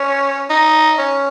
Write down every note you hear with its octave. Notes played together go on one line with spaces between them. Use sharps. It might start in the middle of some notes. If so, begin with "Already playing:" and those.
Already playing: C#4
D#4
C#4